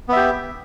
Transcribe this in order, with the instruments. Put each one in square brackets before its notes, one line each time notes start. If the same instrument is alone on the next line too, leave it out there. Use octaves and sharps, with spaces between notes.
[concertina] B3
E5
G4